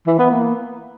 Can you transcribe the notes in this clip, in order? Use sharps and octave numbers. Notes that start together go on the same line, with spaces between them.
E3
B3
A#3